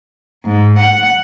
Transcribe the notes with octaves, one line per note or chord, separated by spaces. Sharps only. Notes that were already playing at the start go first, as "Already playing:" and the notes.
G#2
F#5